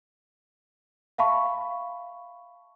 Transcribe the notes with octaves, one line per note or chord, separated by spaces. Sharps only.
E5 F5 A5 B5 C#6